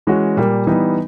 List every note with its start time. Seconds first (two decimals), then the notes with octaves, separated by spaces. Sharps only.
0.07 E3 G#3 C#4 F#4
0.37 A#2 G3 A#3
0.67 E3 G3 B3 D#4